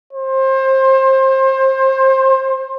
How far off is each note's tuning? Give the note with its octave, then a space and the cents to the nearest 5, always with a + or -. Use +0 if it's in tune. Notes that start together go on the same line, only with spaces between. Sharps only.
C5 +25